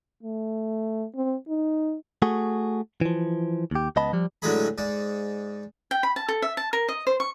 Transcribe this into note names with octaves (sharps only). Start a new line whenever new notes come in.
A3
C4
D#4
A3 F#4 G#4
E3 F3
D#2 G4
C#2 B3 D#5 A5 B5
F3 G3
A2 D3 F#3 G#3 G#4 B5
G#2 D5
G5
B5
A5
A4
E5
A5
A#4
D#5
C5
C#6